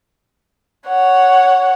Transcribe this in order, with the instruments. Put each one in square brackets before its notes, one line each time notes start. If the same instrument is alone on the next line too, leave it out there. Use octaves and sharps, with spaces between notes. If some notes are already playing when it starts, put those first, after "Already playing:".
[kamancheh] C#5 F#5